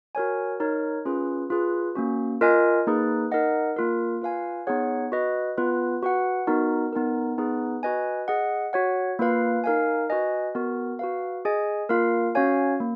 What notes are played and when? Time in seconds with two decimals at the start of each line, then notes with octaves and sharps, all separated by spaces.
0.15 F#4 A#4 C#5 G#5
0.60 D#4 A#4 C#5
1.06 C#4 F4 G#4 B4
1.50 F4 G#4 B4
1.95 A#3 C#4 F#4
2.41 F4 A#4 D#5 G#5
2.87 A#3 D#4 G#4 B4
3.32 D#4 A#4 D#5 F#5
3.77 A#3 F4 A#4
4.22 F4 B4 F5 G#5
4.67 B3 D#4 G#4 C#5 F#5
5.12 F#4 B4 D#5
5.57 B3 F4 B4
6.03 F#4 B4 F#5
6.47 B3 D#4 F#4 A#4
6.93 B3 D#4 A#4
7.38 B3 D#4 G#4 B4
7.83 F#4 B4 D#5 G#5
8.28 G#4 D#5 F#5
8.73 F#4 C#5 F#5
9.19 A#3 F4 B4 F5
9.64 D#4 A#4 F5 G#5
10.10 F#4 B4 D#5 G#5
10.55 B3 F#4 A#4
10.99 F#4 B4 F5
11.45 G#4 D#5 G#5
11.89 A#3 F4 A#4 F5
12.35 C#4 F#4 C#5 F5 G#5
12.80 A#3